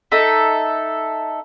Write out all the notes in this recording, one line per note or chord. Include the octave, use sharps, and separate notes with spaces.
D#4 A4 E5